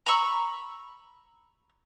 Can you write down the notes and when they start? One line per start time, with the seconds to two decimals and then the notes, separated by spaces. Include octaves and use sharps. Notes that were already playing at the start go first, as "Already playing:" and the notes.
0.06 A#5 B5 C#6 E6